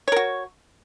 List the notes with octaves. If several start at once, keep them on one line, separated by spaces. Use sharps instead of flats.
F#4 A#4 C#5